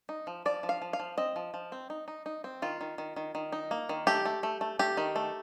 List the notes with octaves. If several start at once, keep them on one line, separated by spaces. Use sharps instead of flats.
D#4
F3
F3 D5
F3
F5
F3
F5
F3
C4 D#5
F3
F3
C4
D#4
D#4
D#4
C4
D#3 F4
D#3
D#3
D#3
D#3
D#4
A#3
D#3
A3 G4
A3
A3
A3
A3 G4
D#3
A3